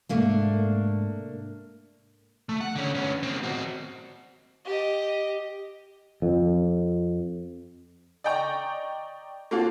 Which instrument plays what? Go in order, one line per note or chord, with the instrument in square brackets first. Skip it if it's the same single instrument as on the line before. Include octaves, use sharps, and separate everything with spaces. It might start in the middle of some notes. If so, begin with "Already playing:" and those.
[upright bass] G#2 C3 [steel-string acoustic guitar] A3 A#3 D4
[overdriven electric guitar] A3
F#5
D3 C#4
B3 C#4
A#3 C4
C4 F#4
[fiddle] G4 D#5
[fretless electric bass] F2
[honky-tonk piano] D5 D#5 G5 A#5 C#6
A#3 C4 F4 F#4 A4